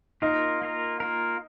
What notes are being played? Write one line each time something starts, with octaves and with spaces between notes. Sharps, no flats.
A#3 D#4 F4 A#4
A#3 F4 A#4
A#3 F4 A#4